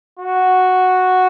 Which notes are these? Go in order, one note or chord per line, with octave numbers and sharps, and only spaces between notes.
F#4